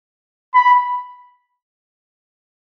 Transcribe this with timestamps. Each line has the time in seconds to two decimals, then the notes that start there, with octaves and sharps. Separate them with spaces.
0.55 B5